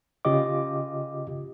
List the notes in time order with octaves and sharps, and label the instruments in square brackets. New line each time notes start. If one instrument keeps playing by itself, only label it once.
[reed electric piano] C#3 F4 G4 D#5 D6